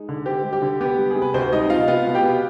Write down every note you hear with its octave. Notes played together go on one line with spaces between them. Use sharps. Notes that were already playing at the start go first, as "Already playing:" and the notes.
Already playing: G#3 D#4
D3
C4 G4
G3
G4
D3
B3 G4
G3
G#4
C3
B4
D2 C4 C5
G3 D#4 D#5
C3 F4 F5
B3 F4 F5
B2
G4 G5
B3